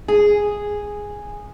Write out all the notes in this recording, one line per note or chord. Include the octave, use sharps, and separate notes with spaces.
G#4